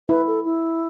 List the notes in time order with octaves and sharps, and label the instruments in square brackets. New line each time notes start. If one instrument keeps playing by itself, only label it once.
[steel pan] E4 [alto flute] B4
[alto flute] A4
E4